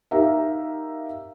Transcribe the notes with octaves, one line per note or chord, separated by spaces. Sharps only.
D#4 G4 A#4 E5 F5 A#5